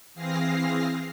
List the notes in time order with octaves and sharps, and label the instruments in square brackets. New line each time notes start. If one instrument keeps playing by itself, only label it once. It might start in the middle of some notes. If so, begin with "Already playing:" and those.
[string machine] E3 C4 G#4 F5 A#6 C7